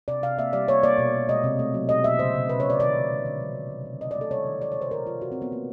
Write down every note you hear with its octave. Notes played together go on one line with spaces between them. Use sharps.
C3 D5
C3 F5
A#3 E5
G3 D5
A#3 C#5
A#3 D5
B2
A#3
G#3 D#5
C3
A3
F#3
B2 D#5
B2 E5
C#3 C5
C#3
C3 B4
C#5
A3
D5
D#3 D5
D#3
G#3
D3
F#3
D#3
C3
C3
A3 D#5
D5
A3
A4
G3 C#5
D#3
F3 D5
C#5
C3
C5
A#2 A#4
F3 F4
B2 F#4
C4
F#3 B3
A3 A#3